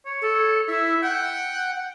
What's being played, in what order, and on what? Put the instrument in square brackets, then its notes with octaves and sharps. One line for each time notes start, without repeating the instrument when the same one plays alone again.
[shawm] C#5
[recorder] A4
[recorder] E4 [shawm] E5
[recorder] F#5 [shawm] G5